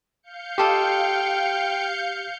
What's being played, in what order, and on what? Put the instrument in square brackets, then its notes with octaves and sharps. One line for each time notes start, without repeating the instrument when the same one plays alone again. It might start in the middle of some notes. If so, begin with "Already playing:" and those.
[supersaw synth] F5 G6 C#7
[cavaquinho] F4 A4 D#5 [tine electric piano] G4 [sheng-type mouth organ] G5